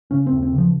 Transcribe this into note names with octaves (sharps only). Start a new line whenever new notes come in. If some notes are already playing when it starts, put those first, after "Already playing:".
C#3 C#4
C4
D#2
C4
C#3
F3